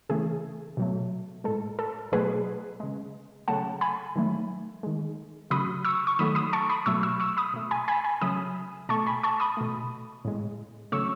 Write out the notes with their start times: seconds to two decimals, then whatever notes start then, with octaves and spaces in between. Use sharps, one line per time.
0.09 C#3 E3 A3 G#4
0.77 B2 F#3 A3
1.44 A2 G#3 A4
1.79 A4
2.12 B2 F#3 A3 G#4 B4
2.80 C#3 G#3
3.48 C#3 F#3 A3 F#5 A5
3.81 G#5 B5
4.16 D#3 F#3 A3
4.83 D#3 G#3
5.50 C#3 F#3 A3 B5 D#6
5.85 C#6 E6
6.07 C#6
6.19 D#3 F#3 A3 B5 D#6
6.35 B5 D#6
6.53 A5 C#6
6.69 B5 D#6
6.86 B2 F#3 A3 C#6 E6
7.03 C#6 E6
7.20 C#6 E6
7.37 B5 D#6
7.54 B2 A3
7.71 G#5 B5
7.88 G#5 B5
8.04 G#5 B5
8.21 C#3 F#3 A3 B5 D#6
8.89 B2 A3 A5 C#6
9.06 G#5 B5
9.23 A5 C#6
9.40 B5 D#6
9.57 B2 A3
10.25 A2 G#3
10.92 C#3 F#3 A3 C#6 E6